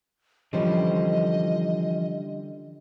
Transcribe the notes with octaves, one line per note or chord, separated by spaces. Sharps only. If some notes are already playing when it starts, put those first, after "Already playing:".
D3 E3 F3 G3 C#4 C5 D#5